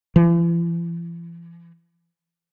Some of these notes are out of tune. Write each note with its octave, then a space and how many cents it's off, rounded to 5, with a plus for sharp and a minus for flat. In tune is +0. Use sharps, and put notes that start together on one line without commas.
E3 +45